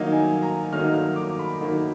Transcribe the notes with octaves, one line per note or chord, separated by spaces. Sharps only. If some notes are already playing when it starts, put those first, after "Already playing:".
Already playing: D#3 F#3 A#3 D#4 F5
G#5
A#5
D#3 F#3 A#3 D#4 F6
F6
D6
B5
D#3 F#3 A#3 D#4